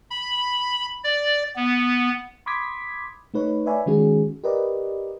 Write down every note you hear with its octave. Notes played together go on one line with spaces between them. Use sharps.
B5
D5
B3
B5 C6 D6 D#6 G#6 B6
A3 D#4 B4 C#5
B4 C#5 D5 E5 G#5 B5
D#3 G#3 C#4 F#4 G#4
G4 A#4 B4 D5 D#5